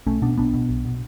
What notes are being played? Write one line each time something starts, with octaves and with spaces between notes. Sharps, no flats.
B1 A3 C#4
B2 B3 D4
B1 B3 D4
B2
B1
B2